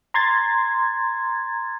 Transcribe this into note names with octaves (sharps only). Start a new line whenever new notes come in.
A#5 C6 G#6 A6